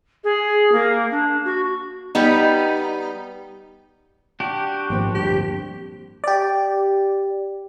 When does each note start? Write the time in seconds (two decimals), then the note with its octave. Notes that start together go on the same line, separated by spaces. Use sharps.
0.24 G#4
0.72 A#3
1.11 D4
1.44 F#4
2.15 G3 B3 D#4
4.40 D4 F#4 G4
4.90 G#1 F3 A#3 C4
5.15 D1 G2 G4
6.24 G4 D5